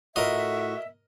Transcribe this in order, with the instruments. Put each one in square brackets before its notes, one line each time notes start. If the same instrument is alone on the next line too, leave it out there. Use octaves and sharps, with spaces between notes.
[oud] A2 F4 [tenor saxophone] F#4 [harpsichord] A#4 D#5 [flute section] E5